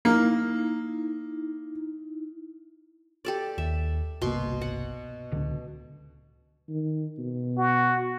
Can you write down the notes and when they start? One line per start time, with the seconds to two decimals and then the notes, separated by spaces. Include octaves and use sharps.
0.05 A#3 D#4 E4
3.25 G4 A4 D5
3.58 D#2 E5
4.22 G1 C2 B2 A#3 C6
4.61 F#5
5.31 D1 C#2 D3
6.69 D#3
7.19 B2
7.57 F#4